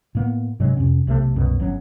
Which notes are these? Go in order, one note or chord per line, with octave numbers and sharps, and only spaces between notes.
A2 A#3 B3
G2 C3 F#3 G#3
F2 C3 C#4
B1 C3 D#3 A3
C2 F#2 B2
G1 F#3 C#4